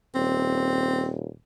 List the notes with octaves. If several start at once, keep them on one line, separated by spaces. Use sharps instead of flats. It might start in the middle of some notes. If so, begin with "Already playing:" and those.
D#1 C4